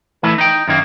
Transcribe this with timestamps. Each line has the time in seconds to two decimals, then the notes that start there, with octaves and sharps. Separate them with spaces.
0.23 E3 A3 E4
0.38 D#4 G5
0.68 F#2 D#3 A#3